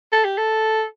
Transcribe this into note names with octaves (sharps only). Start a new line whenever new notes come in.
A4
G4
A4